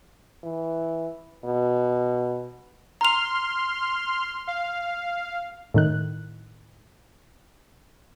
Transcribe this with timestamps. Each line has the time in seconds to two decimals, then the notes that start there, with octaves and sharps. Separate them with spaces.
0.44 E3
1.45 B2
3.01 A#5 C6 F6 F7
4.47 F5
5.74 A2 D#3 F#6